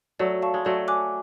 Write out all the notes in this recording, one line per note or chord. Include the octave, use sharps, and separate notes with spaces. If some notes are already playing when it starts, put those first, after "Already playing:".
F#3 A3 D5
F5 A5 C#6
G#3
F#3 A3 D5
G#5 D6 F#6